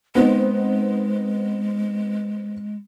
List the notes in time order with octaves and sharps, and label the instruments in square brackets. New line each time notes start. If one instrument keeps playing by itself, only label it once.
[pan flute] G#3 [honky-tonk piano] B3 C4 D#4